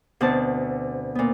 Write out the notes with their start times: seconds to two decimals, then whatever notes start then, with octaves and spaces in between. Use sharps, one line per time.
0.21 D2 B2 C4 A5
1.15 A#2 B3